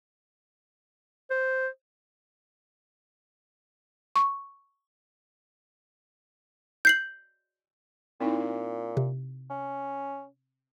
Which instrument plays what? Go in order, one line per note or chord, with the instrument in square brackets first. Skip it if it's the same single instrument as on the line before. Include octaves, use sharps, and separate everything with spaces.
[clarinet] C5
[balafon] C#6
[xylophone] G6 C7 F#7
[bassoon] A#2 [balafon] C4 D#4 E4
[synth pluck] C3
[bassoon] C#4